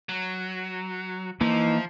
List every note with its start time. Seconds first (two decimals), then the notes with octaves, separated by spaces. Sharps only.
0.09 F#3
1.41 E3 F3 A#3 D#4